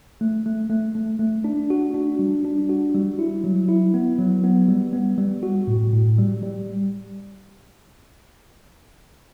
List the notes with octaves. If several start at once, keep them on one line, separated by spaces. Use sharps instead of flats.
A3
A3
A3
A3
A3
D4
F#4
D4
G3
D4
F#4
G3
E4
F#3
E4
B3
F#3
B3
G3
B3
G3
F#4
A2
A2
G3
G3